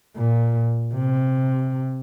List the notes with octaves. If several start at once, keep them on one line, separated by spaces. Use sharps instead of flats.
A#2
C3